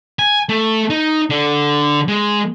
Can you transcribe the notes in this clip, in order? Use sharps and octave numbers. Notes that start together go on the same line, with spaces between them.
G#5
A3
D#4
D3
G#3